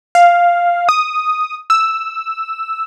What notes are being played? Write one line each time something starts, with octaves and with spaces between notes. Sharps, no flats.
F5
D#6
E6